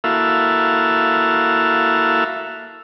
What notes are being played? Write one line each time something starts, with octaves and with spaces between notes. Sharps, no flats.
A#3 E4 F#4 A4 E5 F5